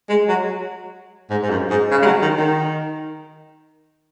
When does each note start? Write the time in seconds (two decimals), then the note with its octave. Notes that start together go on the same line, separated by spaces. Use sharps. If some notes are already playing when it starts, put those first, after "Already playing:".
0.09 G#3
0.28 F#3
1.30 G#2
1.42 G#2
1.50 F#2
1.70 G#2
1.91 C#3
2.02 G#3
2.06 F#3
2.22 D#3
2.37 D#3